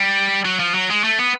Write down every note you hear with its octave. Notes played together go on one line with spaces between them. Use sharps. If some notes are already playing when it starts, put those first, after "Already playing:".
Already playing: G3
F#3
F3
F#3
G#3
A3
B3